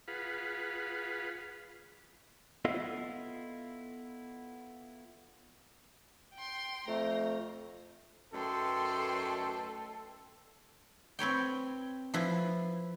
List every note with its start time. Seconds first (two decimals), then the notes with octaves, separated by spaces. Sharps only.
0.08 F4 G#4 B4 F5 F#5 B5
2.65 B3 E4 F4 A4 D#5 F5
6.34 G5 C6
6.88 F2 A3 A#5
8.34 F#2 A3 D#4 A4 B4 G5 C6
11.19 C4 B4 C#5 G5
12.14 F3 E4 B4